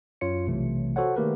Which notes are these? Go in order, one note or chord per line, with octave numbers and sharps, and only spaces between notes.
F#2 F4 C#5 C#7
B1 C3 E3 A3
F#4 A4 C5 C#5 F#5
D#3 A3 A#3 G4 A#4 B4